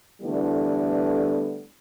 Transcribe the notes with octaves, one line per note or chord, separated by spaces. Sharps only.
D3 E3 G3 A3 B3 E4